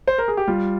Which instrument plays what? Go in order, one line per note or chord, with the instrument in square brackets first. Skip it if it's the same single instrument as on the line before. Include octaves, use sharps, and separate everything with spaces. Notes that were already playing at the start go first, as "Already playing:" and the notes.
[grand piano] C5
A#4
G#4
G4
G3 F4